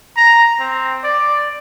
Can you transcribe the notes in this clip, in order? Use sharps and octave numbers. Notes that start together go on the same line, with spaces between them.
A#5
C4
D5